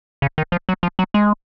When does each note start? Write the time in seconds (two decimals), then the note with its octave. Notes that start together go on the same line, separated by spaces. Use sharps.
0.22 C#3
0.38 D#3
0.52 F3
0.69 F#3
0.83 F3
0.99 F#3
1.14 G#3